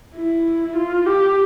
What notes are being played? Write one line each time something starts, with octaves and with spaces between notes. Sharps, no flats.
E4
F4
G4